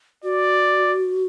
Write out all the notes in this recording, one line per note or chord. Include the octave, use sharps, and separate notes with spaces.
F#4 D5